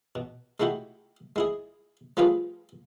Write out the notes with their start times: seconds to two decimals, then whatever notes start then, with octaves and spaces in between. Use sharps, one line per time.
0.15 B2
0.60 G#3 A3 E4 F#4 G4
1.36 G#3 E4 G#4
2.17 F3 G3 A3 F4 G#4 B4